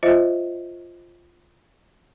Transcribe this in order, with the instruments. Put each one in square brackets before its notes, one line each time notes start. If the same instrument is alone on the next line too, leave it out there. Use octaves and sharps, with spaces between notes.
[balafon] F4 C5 D#5 E5